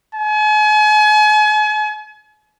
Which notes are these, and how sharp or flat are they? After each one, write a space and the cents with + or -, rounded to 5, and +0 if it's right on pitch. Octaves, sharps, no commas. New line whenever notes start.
G#5 +40